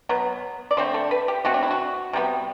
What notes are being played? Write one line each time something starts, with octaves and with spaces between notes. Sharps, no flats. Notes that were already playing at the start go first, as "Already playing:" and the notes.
B2 F#3 B3
D5
D3 A3 C4 C5
A4
B4
G4
B2 A3 C4 F#4
D4
E4
F#4
C3 G3 B3